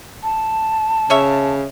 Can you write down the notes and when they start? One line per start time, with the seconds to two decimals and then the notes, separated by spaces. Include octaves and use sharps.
0.24 A5
1.10 C#3 C#4 C#5 E5